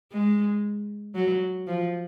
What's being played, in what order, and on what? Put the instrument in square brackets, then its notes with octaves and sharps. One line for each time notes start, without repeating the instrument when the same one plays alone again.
[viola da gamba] G#3
F#3
F3